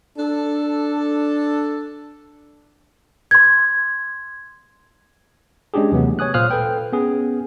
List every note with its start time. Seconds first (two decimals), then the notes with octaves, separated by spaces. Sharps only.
0.18 D4 A4
3.31 C6 G#6
5.74 G#3 C#4 D4 G4 G#4
5.92 D#2 C3 E3 F#3 A3 B3
6.19 C#5 G#5 D#6 F#6
6.34 A#2 C5 F5 D#6 F6 F#6
6.51 A4 B4 G5
6.92 B3 C#4 G#4